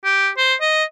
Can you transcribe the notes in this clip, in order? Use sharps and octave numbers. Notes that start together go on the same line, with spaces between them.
G4
C5
D#5